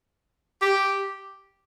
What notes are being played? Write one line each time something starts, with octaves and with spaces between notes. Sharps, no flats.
G4